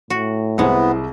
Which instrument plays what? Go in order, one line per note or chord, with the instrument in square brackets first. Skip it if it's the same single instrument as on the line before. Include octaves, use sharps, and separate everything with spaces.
[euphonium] A2 [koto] F#4
[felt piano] C2 E4 C5 [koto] G#3 F#5 [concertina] B3